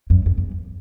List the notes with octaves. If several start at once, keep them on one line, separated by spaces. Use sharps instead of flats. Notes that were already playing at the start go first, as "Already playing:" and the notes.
F#2
F#2
E2